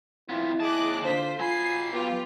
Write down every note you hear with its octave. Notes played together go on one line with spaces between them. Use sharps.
F2 B3 E4 F4
D#2 G#4 D#5 A5 D6 F#6
D3 F4 C5 B6
F#3 F4 G#5 B5 C7
B3 F4 G4